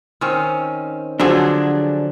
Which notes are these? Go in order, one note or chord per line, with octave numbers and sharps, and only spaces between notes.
D#3 C4 C#4
D3 F3 F#3 D4 G#4